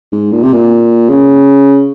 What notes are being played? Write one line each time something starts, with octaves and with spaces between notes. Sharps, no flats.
G#2
A#2
C3
A#2
C#3